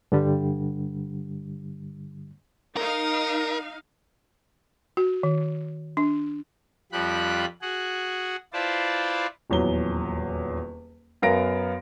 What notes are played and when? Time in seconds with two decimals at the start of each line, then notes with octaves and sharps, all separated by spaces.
0.12 G2 D3 G3
2.77 D#4 A#4 F5
4.97 F#4
5.23 D#3
5.97 D4
6.92 F2 F3 G3 B5 F#6
7.61 F#4 G#4 F#5
8.53 E4 F4 B4 C5 D5 A5
9.50 D#1 E2 F#3 G7
11.22 F#2 B3 A#4 F5 A#6 D7